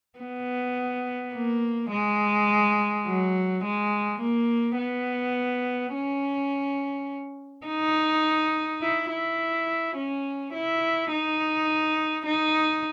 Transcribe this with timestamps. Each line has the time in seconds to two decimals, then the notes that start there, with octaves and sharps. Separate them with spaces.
0.19 B3
1.34 A#3
1.91 G#3
3.06 F#3
3.64 G#3
4.21 A#3
4.78 B3
5.94 C#4
7.66 D#4
8.81 E4
9.10 E4
9.96 C#4
10.53 E4
11.12 D#4
12.25 D#4